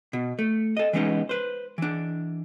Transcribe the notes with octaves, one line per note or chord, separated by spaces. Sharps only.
B2
A3
A4 D#5
E3 G#3 B3 C#4 D#4
B4 C5
E3 D4